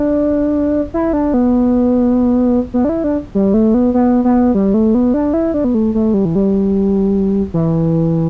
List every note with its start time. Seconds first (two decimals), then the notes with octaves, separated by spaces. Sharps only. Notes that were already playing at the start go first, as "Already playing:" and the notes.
Already playing: D4
0.94 E4
1.13 D4
1.34 B3
2.74 B3
2.85 D4
2.89 E4
3.04 D4
3.35 G3
3.54 A3
3.74 B3
3.94 B3
4.25 B3
4.55 G3
4.74 A3
4.95 B3
5.14 D4
5.34 E4
5.54 D4
5.64 B3
5.75 A3
5.95 A3
6.14 G3
6.25 E3
6.35 G3
7.54 E3